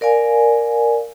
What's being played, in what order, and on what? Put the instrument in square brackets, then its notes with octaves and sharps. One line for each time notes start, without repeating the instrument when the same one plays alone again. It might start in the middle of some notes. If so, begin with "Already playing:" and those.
[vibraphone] A#4 D5 F5 G#5